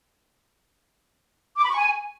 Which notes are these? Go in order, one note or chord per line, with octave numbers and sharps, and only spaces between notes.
D6
B5
C#6
G#5